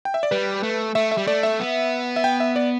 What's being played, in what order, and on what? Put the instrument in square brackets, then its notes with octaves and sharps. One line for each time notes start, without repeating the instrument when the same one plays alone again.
[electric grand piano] G5
E5
D5
[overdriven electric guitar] G3 [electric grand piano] B4
[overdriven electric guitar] A3
[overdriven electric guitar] A3 [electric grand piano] E5
[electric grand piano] E5
[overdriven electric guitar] G3
[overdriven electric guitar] A3 [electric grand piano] D5
[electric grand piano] E5
[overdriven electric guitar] B3
[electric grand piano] E5
G5
E5
D5